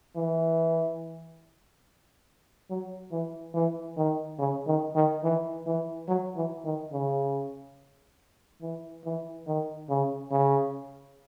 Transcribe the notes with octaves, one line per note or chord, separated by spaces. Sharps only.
E3
F#3
E3
E3
D#3
C#3
D#3
D#3
E3
E3
F#3
E3
D#3
C#3
E3
E3
D#3
C#3
C#3